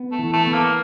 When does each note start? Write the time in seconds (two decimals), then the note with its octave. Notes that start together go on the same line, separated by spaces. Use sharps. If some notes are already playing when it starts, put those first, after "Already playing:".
Already playing: B3
0.12 A3
0.19 E3
0.33 A3
0.47 B3
0.54 A#3